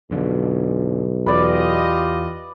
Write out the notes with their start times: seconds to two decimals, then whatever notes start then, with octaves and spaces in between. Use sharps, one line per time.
0.11 B1 F2 D3 F3
1.26 E2 F4 G4 B4 D5 D#5 D6